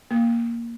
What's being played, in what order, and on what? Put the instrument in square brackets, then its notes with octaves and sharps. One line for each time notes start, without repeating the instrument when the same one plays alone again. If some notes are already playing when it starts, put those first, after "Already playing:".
[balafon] A#3